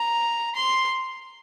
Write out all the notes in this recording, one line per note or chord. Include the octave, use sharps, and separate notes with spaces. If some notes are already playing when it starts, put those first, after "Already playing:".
Already playing: A#5
C6